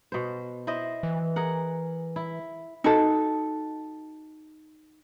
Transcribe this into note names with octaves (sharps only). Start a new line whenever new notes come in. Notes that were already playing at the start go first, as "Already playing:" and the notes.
B2 C5
E4 C5 D#5
E3
G#4 A#4 F#5
E4
D#4 F#4 A4